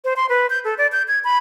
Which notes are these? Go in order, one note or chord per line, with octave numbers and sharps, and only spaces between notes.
C5
C6
B4
G6
A4
D5
G6
G#6
B5